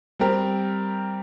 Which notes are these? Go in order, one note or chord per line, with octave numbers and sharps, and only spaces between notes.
G3 C4 G4 A#4